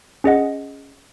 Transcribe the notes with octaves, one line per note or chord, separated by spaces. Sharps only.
C#4 G#4 D#5 F#5